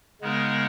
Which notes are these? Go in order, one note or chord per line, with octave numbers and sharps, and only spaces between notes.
C#3 G#3 B3 D#4 A#4